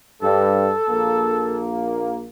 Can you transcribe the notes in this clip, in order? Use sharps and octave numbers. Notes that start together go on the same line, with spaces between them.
G2 A4
A#1 A#3